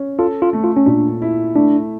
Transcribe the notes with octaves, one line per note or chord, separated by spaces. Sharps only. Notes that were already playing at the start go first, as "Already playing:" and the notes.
Already playing: C#4
F4 A4
F4
A3
F4
C#4
A#2 D4
E4
A3 D4